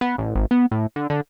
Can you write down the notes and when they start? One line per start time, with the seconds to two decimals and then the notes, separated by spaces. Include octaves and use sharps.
0.01 B3
0.18 A1
0.35 G#1
0.51 B3
0.71 A2
0.96 D3
1.10 D3